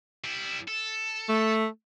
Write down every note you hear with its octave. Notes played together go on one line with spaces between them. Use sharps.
G3 E4
A4
A3